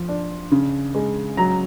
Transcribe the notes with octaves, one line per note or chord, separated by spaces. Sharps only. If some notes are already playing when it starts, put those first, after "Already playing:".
Already playing: F3
D4
C#3
G#3
F#3 A#5